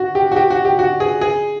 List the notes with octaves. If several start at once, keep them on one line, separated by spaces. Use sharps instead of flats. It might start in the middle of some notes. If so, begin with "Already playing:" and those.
Already playing: F#4
G4
F#4
G4
F#4
G4
F#4
G#4
G#4